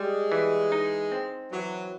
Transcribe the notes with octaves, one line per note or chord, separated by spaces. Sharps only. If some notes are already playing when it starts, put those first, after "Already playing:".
Already playing: G3 G#3
E3
D#4
C4
E3 F#3